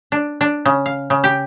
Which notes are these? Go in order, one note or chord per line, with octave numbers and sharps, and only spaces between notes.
D4
D4
C#3
F5
C#3
G4